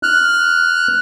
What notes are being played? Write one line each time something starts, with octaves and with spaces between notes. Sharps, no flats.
F6 F#6